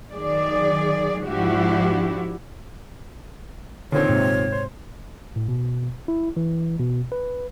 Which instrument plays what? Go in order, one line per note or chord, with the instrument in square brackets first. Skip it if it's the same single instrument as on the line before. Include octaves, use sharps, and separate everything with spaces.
[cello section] D#3 F#3 G#4 D5
G#2 F3 D4 E4 F#4 G4
[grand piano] A#2 D#3 C4 [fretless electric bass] D3 [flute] C#5
[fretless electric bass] G#2 C3
[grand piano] C5
[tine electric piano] A2
B2
E4
E3
B2
B4